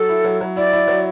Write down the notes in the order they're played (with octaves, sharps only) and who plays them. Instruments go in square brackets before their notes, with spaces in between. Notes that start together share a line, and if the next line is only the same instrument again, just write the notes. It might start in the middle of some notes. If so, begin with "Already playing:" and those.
Already playing: [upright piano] F#3 [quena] A4
[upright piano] E4
F#3
F#3
[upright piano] E4 [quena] D5
[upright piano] E4
F#3